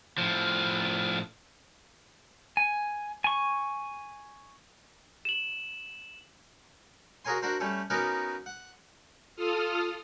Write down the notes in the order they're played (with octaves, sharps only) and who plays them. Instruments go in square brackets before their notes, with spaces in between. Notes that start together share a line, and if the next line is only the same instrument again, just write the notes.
[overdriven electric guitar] A2 F3
[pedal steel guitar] G#5
G#5 C#6
[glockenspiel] E7 F#7
[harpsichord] F#4 G#4 A#4 C#5 G#5 C6
D4 F#4 A#4 C5
G3 A3 C#4 A4
B3 C#4 D#4 F#4 A#4 D6
F#5
[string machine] F4 A4 D#6 F6